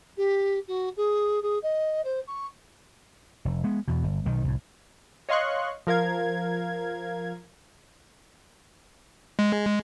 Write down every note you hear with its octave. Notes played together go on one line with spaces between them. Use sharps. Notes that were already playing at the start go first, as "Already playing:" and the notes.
G4
F#4
G#4
G#4
D#5
C5
C#6
F1
G#3 B3
E2 B2
G1
B1 D#3
C2 A2
C#5 D#5 F5 C6 C#6 F#6
F3 A#4 F5 G#6
G#3